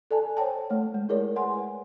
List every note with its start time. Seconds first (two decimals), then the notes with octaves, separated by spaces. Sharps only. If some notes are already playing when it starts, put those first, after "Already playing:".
0.11 A4 D5 G#5 A5
0.37 C5 C#5 G5 A5
0.70 A3 C#5
0.94 G#3
1.09 E4 G#4 A#4 C#5 D5
1.36 B4 F#5 G#5 C6